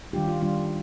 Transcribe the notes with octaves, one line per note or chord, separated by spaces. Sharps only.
D#3 G3 D4 F4 G4
F4
D#3 G3 D4 F4